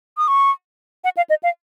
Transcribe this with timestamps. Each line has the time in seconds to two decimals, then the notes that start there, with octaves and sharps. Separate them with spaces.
0.18 D#6
0.28 C#6
1.04 F#5
1.17 F5
1.30 D#5
1.43 F5